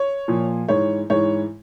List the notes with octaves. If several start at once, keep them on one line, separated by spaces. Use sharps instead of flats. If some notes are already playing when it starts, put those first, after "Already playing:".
Already playing: C#5
A#2 F3
G#2 E3 C#5
G#2 E3 C#5